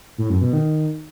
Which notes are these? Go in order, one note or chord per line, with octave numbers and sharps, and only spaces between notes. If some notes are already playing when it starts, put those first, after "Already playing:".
A2
F#2
B2
D#3